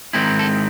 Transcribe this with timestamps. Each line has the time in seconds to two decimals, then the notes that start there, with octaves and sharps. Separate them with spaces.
0.13 G#2 D#3 G#3 C4 E4
0.39 A4